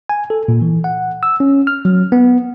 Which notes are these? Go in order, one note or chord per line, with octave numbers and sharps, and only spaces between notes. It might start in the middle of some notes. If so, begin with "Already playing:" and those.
G#5
A4
A#2
E3
F#5
E6
C#4
F6
F#3
B3